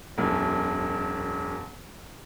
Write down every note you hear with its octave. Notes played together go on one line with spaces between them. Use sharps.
E1 B1 F#2